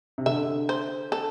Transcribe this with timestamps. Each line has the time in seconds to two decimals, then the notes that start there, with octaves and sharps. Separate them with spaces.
0.18 C3
0.26 D3 E5
0.69 C5
1.12 A4